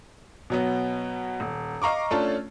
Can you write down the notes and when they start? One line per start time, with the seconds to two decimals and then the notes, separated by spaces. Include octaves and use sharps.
0.50 B2 F#3 B3
1.40 D#1
1.82 D#5 F5 A#5 C#6 D6
2.11 A3 C#4 D4 F4 C#5 A5